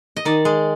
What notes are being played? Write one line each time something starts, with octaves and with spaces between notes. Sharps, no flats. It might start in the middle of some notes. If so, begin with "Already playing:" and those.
D#5
D#3 D5
G#3